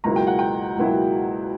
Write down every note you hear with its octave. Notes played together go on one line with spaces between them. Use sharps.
C#2 B2 F#3 A#3 E4 A#5
G5
F#5
G5
C#2 B2 F#3 A#3 E4